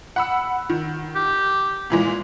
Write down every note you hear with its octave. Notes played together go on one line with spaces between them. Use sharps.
F#5 B5 E6
D#3
G4
A#2 E3 G#3